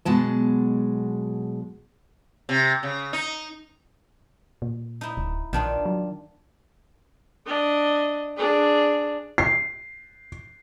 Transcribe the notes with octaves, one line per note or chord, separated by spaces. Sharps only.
B2 F#3 G#3 A5
C3
C#3
D#4
A#2
D#4 E4
D1
A#1 D#3 D4 F4
F#3
D4 D#5
D4 G#4
C7